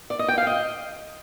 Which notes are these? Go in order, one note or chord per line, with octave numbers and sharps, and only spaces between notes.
D5
D#5
G5
F5
D#5